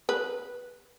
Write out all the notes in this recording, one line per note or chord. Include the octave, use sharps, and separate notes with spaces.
B4